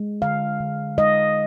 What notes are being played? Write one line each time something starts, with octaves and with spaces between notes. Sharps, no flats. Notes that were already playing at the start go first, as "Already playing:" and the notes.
Already playing: G#3
D3 F5
D3
G#3 D#5